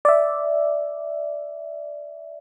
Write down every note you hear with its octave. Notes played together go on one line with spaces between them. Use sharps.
D5 E5